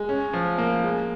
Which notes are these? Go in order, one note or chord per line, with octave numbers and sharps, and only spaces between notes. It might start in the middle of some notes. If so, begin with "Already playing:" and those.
Already playing: G#3
C#4
F3
A#3
G#3